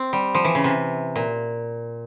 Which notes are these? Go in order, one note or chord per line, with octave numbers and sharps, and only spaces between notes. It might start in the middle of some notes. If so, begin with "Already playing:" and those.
Already playing: C4
G3
F3
E3
C#3
C3
A#2